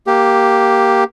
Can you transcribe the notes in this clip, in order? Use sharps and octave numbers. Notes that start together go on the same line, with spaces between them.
A#3 G4